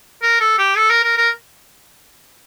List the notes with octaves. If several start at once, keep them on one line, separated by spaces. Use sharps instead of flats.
A#4
A4
G4
A4
A#4
A#4
A#4